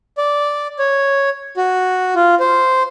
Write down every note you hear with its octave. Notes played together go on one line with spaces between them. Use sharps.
D5
C#5
F#4
F4
C5